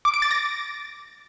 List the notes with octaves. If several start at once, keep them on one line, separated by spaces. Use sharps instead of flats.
D6
D7
A6
A#6